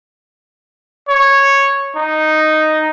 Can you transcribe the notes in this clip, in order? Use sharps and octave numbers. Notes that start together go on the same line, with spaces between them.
C#5
D#4